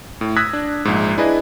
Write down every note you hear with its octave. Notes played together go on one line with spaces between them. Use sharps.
A2
D#6 E6 F#6 G#6 A#6 B6
D4
A#1 G#2
D4 E4 G#4 B4 D5 D#5